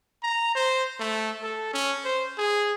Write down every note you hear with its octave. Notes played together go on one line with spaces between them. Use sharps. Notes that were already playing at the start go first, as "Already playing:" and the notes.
A#5
C5
A3
A4
C#4
C5
G#4